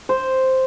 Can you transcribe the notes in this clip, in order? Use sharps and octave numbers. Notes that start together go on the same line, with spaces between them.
C5